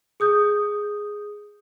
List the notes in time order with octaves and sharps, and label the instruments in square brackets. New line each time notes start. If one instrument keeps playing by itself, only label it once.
[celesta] G#4 D#6 G6